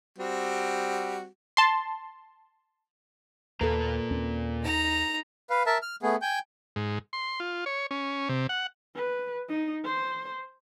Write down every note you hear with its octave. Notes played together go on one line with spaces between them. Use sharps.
G3 C4 F#4
A5 C6
D#2 A#2 A#3 A4 B4 A#5
D#2 C4 C#4
D#4 A#5
B4 F5
A#4 E5 A5
F6
A3 B3 G#4
G5 G#5 G6
G#2
C6
F4
C#5
C#4
C3
F#5
B4
D#4
C5